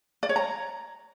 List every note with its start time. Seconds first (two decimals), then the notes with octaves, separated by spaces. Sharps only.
0.23 D5
0.29 C#5
0.36 A#5